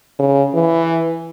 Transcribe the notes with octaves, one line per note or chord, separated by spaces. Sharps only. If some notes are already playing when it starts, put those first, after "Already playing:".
C#3
E3